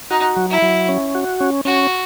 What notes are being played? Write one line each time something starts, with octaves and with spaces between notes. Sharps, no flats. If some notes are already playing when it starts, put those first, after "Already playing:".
D#4 F#4
F#3
E4
F#3
C#4
F#4
C#4
C#4 F#4